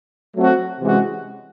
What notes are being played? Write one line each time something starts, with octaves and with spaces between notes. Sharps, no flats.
F#3 A3 C4 F#4 A4
C3 E3 G#3 C#4 F#4